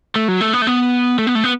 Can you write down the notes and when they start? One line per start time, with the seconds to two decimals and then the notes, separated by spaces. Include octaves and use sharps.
0.16 A3
0.28 F#3
0.41 A3
0.53 B3
0.62 A3
0.67 B3
1.19 A3
1.27 B3
1.35 A3
1.44 B3